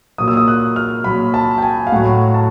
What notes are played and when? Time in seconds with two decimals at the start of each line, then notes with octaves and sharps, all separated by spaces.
0.18 A#2 F#3 D#6
0.28 E6
0.37 D#6
0.48 F#6
0.76 F6
1.04 A#2 F#3 B5
1.34 A5
1.58 G5
1.62 G#5
1.87 F5
1.92 A2 F#3 F#5
2.34 A5